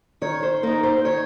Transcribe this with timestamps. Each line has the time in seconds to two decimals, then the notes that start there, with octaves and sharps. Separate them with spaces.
0.22 D#3 C#5
0.43 C5
0.63 A#3 D#4 A#4
0.83 C5
0.98 C5
1.05 D#3 C#5